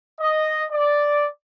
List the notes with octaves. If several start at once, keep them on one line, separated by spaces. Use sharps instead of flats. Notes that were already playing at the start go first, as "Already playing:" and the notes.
D#5
D5